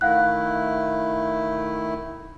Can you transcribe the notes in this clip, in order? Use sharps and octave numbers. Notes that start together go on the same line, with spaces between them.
D#3 A3 E4 F5 F#5 F#6